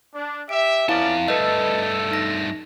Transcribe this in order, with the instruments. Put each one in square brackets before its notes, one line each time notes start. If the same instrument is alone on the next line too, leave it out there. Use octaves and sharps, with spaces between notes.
[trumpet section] D4
[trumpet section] G4 E5 [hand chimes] D7
[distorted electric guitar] F2 A5 [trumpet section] B3 C#4 D5 [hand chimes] E4 F5
[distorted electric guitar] G2 A3 [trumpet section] A4 [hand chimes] B4 D#5
[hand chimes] D#4 A#6